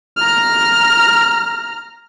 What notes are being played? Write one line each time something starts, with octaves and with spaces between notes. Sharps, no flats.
A#5 F6